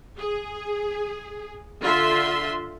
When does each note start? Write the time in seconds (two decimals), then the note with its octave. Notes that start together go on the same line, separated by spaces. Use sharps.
0.18 G#4
1.82 D3 F4 E5 C6